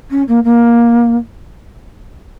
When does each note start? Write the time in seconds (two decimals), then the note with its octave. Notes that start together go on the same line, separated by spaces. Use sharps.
0.10 C#4
0.27 A#3
0.44 A#3